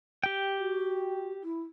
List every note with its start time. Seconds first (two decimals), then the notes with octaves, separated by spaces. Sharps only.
0.24 G4 G5
0.59 F#4
1.43 E4